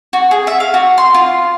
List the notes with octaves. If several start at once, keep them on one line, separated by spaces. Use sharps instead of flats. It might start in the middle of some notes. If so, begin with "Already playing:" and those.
F#4
G#4
E5
F5
F#4
C6
F4